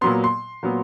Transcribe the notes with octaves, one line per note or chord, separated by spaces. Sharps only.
A#2 F#3 B3 C6
C6
A#2 F#3 B3